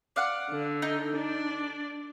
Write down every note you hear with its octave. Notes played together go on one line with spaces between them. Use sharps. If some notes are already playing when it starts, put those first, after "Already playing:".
D5 F5 F#5
D3
D#4
D4 D5